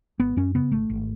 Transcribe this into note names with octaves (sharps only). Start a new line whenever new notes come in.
G#1 B3
F#2 C#4
C#3 B3
G#1 A3
G#1